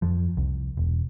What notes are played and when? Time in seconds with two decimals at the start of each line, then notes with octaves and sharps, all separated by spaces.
0.02 F2 F3
0.37 C2
0.77 E1